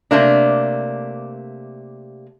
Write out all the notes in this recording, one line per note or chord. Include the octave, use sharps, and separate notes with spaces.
C3 A3 A#3 D4